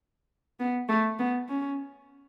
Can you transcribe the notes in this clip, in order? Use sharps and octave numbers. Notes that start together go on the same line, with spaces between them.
B3
A3
B3
C#4